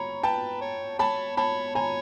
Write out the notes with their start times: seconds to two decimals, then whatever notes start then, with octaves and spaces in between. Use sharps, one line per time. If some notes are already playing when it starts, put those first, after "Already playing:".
Already playing: C#5 A#5 B5
0.23 B4 G5 A5
0.62 C#5
0.99 C#5 A5 B5
1.37 C#5 A5 B5
1.75 C#5 G#5 A#5